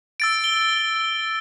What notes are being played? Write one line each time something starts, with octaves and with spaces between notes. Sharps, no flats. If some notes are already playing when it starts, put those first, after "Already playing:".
E6 A6 D7
G7